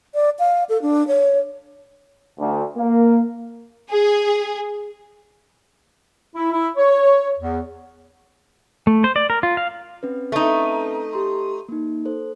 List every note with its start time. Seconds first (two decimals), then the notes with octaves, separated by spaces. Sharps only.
0.15 D5
0.39 F5
0.69 A4
0.82 D4
1.08 C#5
2.39 D2
2.77 A#3
3.91 G#4
6.35 E4
6.52 E4
6.76 C#5
7.39 E2
8.87 A3
9.04 C5
9.16 D5
9.30 A#4
9.43 F4
9.57 F5
10.03 C4 C#4 B4
10.32 A3 D#4
11.13 G4 C6
11.69 A#3 D#4
12.05 A4 C5